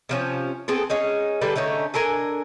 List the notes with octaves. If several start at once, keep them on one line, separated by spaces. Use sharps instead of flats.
C3 F3 C#4
B3 C4 G#4 A4
C#4 D#4 G#4
D3 G3 A4 B4
D3 A3 C#4 D#4
D4 A4 A#4 G#5